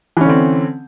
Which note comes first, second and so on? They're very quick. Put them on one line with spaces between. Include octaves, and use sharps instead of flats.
E3 C#4 D3 C4